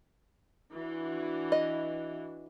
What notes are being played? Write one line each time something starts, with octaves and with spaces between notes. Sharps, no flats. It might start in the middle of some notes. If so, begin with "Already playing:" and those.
E3 D4 F#4
D#5